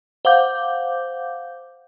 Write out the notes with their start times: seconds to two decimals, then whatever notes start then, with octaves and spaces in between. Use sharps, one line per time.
0.25 C5 F5 F#5 D6 G6